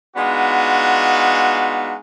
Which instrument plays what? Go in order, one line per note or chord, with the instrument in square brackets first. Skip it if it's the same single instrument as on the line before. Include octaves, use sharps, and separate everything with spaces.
[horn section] G#3 B3 D4 D#4 F4 F#4